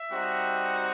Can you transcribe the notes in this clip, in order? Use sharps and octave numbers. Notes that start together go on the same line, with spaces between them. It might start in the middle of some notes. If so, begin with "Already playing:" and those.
Already playing: E5
G3 C4 D#4 F#4